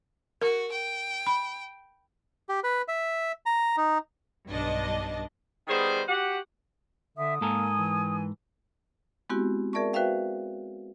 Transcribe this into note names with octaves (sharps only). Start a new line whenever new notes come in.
F#4 A#4
G5
B5
G4
B4
E5
A#5
D#4
B1 G2 D4 D#5 A5
D#3 G3 B3 G#4 C5
F#4 G4 F#5
D3 E5 D#6
G#2 A#3 A4 A#4 G#5
E3
G#3 B3 C4 E4 F#4 G4
G#4 A#4 D5 E5 A5 C#6
F#4 B4 C5 E5 F5 G5